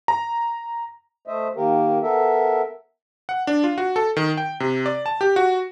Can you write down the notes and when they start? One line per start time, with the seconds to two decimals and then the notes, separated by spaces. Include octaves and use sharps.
0.08 A#5
1.27 A3 C5 D#5 E5
1.56 D#3 A#3 G4 A#4
2.02 B3 A4 A#4 E5
3.29 F#5
3.47 D4
3.64 F4
3.78 F#4
3.96 A4
4.17 D#3
4.37 G5
4.60 C3
4.86 D5
5.06 A5
5.21 G4
5.36 F#4